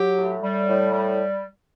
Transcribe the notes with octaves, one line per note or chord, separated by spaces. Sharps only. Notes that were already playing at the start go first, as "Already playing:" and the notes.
Already playing: F#3 G4
A2
G3
A2
G3